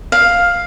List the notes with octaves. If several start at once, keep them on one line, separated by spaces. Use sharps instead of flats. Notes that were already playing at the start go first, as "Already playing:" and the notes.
F5